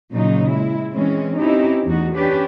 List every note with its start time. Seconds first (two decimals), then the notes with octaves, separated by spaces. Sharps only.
0.12 A#2 C#3 F#3 D#4
0.50 G#3 E4
0.93 E3 G#3 C4 C#4
1.38 C4 C#4 D#4 E4 G4
1.85 E2 A3 D#4 F#4
2.15 C#4 D4 G4 B4